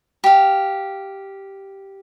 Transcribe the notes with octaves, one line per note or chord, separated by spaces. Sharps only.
G4 F5